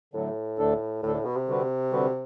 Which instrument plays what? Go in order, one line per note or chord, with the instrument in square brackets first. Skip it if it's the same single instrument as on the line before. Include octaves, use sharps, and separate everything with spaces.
[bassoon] A2 [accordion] D3 F#3 A3
[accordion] D2 D3 A3 D4 A4
[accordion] D2 D3 A3 D4 A4 [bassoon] A2
[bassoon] A2
B2
C3
[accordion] D3 G3 C4 F#4 B4
D3 G3 C4 F#4 B4